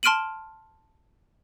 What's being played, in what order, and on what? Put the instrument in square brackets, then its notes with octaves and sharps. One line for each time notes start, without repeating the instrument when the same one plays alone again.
[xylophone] A5 C6 F6 D7 D#7 F#7